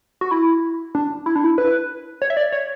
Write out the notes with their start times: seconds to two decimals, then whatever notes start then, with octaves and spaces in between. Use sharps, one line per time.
0.21 F#4
0.31 E4
0.95 D4
1.26 E4
1.36 D4
1.44 E4
1.58 B4
2.22 C#5
2.30 E5
2.37 D5
2.52 C#5